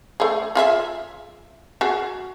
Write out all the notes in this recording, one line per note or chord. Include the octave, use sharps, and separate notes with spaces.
A3 G#4
F4 G#4 E5
F#4 G#4